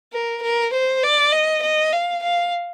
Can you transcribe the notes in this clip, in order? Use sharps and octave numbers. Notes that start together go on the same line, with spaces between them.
A#4
A#4
C5
D5
D#5
D#5
F5
F5